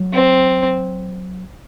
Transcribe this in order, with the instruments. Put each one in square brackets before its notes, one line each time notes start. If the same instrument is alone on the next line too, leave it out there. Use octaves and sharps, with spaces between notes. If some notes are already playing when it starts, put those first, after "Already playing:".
Already playing: [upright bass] F#3
[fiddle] C4